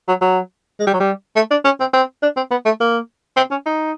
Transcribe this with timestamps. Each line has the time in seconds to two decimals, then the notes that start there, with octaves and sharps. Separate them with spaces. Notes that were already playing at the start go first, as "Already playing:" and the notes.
0.08 F#3
0.21 F#3
0.80 G#3
0.87 G3
0.94 F#3
1.00 G3
1.36 A3
1.51 D4
1.65 C#4
1.80 C4
1.93 C4
2.22 D4
2.36 C4
2.51 B3
2.65 A3
2.80 A#3
3.37 C4
3.51 C#4
3.66 D#4